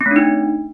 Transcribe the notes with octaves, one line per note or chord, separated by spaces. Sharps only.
C4
A3
D4
D#4